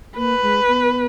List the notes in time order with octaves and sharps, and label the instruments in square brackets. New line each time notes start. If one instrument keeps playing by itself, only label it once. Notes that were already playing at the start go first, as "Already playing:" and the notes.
[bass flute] A#3 [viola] B4
[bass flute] G#3
B3